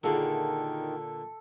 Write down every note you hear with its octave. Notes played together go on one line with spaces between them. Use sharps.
A#2 D3 D#3 F4 F#4 G#4 A4